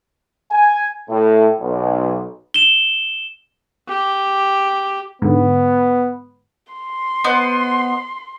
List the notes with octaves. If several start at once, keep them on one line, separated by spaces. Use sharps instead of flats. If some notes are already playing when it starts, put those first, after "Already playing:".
G#5
A2
B1
E7 G7
G4
G#2 D3 B3
C6
B3 C5 D#5